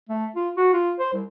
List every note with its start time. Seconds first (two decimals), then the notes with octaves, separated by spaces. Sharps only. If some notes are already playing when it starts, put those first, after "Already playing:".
0.09 A3
0.36 F4
0.57 F#4
0.73 F4
0.99 C5
1.14 C2